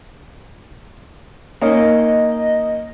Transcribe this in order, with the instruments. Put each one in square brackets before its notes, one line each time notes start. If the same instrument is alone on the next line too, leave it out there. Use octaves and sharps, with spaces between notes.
[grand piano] A#3 C#4 D#4 [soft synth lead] D#5